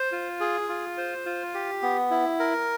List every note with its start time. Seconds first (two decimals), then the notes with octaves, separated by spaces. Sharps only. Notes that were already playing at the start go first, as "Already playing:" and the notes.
Already playing: C5
0.12 F4
0.40 G#4
0.69 F4
0.97 C5
1.26 F4
1.54 G4
1.82 B3
2.11 E4
2.40 A#4